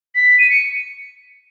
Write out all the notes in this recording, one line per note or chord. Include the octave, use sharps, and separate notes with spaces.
B6
D#7
C#7